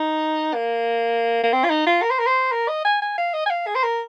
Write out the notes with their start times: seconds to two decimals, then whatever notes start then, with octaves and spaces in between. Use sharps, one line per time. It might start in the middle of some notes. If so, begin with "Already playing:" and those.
Already playing: D#4
0.54 A#3
1.44 A#3
1.53 C4
1.64 F4
1.70 D#4
1.86 F4
2.02 A#4
2.11 C5
2.19 A#4
2.27 C5
2.52 A#4
2.68 D#5
2.85 G#5
3.02 G#5
3.18 F5
3.34 D#5
3.46 G#5
3.50 F5
3.67 G#4
3.76 C5
3.84 A#4